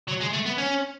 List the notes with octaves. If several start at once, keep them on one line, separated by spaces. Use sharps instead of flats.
F#3
G#3
A3
B3
C#4